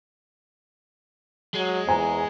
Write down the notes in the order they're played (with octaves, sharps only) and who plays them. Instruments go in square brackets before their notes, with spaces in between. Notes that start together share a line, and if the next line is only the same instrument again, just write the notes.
[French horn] F#3 [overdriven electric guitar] G#3
[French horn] E2 [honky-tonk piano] C5 G#5 A#5